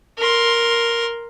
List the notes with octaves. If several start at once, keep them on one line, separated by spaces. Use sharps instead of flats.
A#4 C6